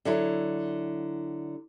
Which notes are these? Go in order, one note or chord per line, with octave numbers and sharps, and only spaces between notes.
D3 F#3 E4